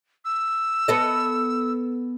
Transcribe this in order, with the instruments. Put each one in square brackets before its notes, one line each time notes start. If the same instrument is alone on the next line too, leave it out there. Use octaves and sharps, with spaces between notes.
[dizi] E6
[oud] B3 A4 D#5